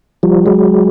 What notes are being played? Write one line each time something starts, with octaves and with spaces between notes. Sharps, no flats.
F3 G3
F#3 G#3